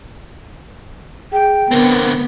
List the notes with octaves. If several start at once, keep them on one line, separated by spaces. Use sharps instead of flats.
G#4 G5
D3 B3 C4 A#4